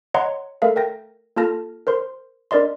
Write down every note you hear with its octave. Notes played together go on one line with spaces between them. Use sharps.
C#5 D#5 F#5 A#5 C6
A3 A4 A#4 E5 F5
A#4 G5 A#6
A#3 F4 A4 A5 F6 A#6
A#4 C5 C6
D4 A#4 D5 D#5 C6